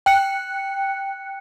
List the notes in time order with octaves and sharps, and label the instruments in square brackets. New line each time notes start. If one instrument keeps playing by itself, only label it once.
[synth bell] G5 F#6 C#7